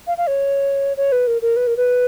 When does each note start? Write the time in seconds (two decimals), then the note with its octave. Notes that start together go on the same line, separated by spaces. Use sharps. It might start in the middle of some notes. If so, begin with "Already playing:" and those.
0.07 F5
0.17 F5
0.27 C#5
0.97 C#5
1.12 B4
1.27 A#4
1.42 A#4
1.56 B4
1.67 A#4
1.77 B4